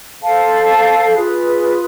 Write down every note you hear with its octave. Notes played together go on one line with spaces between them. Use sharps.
A4 C5 F5 A5
F4 G#4 B4